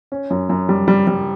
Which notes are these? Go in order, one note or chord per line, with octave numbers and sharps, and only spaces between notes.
C#4
F#2
F#2
G3
G3
G3